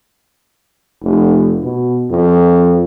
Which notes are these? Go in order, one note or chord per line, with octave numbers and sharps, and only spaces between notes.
F1
B2
F2